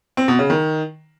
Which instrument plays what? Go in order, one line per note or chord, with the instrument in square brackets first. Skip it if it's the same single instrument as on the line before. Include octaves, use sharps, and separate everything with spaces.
[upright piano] C4
B2
C#3
D#3